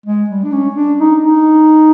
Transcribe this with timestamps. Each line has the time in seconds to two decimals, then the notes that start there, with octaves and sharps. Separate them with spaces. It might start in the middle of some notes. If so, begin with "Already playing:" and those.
0.06 G#3
0.30 G3
0.44 D4
0.52 C#4
0.76 D4
1.00 D#4
1.24 D#4